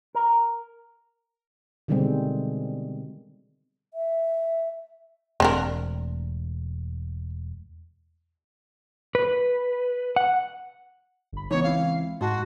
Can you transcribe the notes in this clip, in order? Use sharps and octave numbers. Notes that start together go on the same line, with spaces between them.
A#4
B2 D3 D#3 G3 G#3 C4
E5
E1 A3 C4 D4 A#4
B4
F#5
G1 B5
C#2 E3 B3 D#4 C#5
C4 E4 F5
G#2 F#4 A5 C6